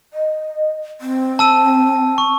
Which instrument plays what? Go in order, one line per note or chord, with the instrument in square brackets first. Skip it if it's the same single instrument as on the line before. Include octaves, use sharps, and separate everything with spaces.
[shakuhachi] D#5
C4
[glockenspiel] A5 E6 D#7
C#6